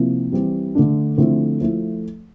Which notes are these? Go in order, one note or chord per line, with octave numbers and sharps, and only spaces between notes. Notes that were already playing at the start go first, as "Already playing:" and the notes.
Already playing: C3 F3 A#3 E4
E3 G3 C4
D3 A3 D4
D3 F3 A3 C4 E4
F3 A3 E4